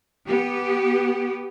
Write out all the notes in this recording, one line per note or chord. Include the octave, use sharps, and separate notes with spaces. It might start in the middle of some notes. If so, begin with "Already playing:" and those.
B3 G4